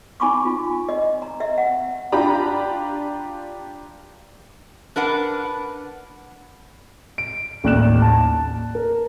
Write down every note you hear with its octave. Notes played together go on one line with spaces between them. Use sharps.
D#4 G#5 B5 C#6 D6
F4
D#5
A#5
D#5 E5
F#5
D4 F4 G4 A#5 B5
D4 A#4 B4 F#5
D7
A1 D#2 D5 F#6 E7
A5
A#4